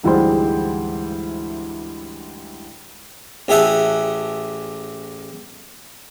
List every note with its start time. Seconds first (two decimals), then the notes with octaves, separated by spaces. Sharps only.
0.03 D2 G#2 E3 G3 G#3 C5
3.48 A1 G4 G#4 E5 F#5 A5